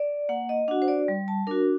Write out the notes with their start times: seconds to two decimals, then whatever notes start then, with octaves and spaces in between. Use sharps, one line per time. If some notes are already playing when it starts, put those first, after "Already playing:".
Already playing: D5
0.29 A#3 F#5
0.49 D#5
0.68 D4 F#4 F#5
0.82 C5
0.88 D5
1.08 G3
1.28 A5
1.47 D4 F#4 A#4